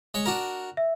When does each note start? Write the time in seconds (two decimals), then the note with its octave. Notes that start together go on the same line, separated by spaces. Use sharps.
0.14 G#3 C#5
0.26 D4 F#4 A#4
0.77 E5